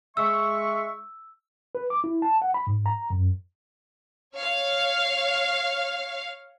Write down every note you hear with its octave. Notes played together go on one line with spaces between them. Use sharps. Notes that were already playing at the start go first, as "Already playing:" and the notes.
G#3 E5 C#6 E6
B4
D6
E4
A5
F#5
B5
G#2
A#5
F#2
C#5 F5